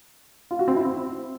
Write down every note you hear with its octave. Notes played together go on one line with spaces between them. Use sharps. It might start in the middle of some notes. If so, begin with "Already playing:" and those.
F4
F#4
C4
E4
C4